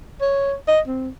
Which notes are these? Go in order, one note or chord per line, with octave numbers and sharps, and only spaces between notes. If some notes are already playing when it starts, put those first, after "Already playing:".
C#5
D#5
C4